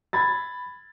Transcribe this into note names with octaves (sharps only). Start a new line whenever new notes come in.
B5 G#6 A6